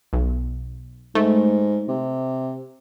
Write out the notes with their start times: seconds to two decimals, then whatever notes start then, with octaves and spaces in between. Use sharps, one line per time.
0.13 B1
1.15 G#2 A3
1.88 C3